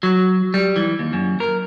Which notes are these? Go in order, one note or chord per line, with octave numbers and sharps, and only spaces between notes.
F#3
G3
E3
D#2
F#2
A#4